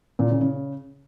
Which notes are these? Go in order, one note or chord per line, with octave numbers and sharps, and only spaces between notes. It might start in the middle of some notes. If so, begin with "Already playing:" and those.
A#2
C#3
C#3